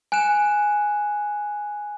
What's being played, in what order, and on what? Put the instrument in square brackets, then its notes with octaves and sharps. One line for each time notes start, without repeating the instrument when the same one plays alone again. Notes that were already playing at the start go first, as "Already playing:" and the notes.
[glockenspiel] G#5 F#6 C#7 E7